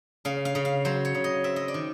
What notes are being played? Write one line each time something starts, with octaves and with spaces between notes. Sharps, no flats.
C#3 F5
F5
C#3
F5
F#3 C5
C#5
C#3
D#5
C4 E5
D#5
D5
D#3